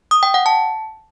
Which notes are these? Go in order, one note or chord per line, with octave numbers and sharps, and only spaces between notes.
D#6
G5
F#5
A5